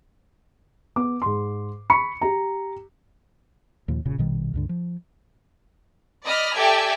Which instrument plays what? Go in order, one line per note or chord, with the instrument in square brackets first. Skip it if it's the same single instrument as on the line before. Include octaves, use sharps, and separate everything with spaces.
[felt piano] B3 D6
G#2 C6
B5 C#6 C#7
G4 A#5
[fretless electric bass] D#2 A#2 F3
E1 A#2 C#3
A#1 B2 D#3 G3
C#2 G2 D3
F3
[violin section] D5 D#5 B5 F6
G4 A4 D5 E5 G5 G#5